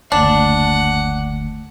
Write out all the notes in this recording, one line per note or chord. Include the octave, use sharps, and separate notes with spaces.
F#1 D2 D4 F#5